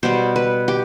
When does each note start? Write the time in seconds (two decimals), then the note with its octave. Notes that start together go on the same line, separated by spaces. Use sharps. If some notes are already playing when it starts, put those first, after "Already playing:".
0.03 B2 G3 B3 C5
0.36 B4
0.68 G4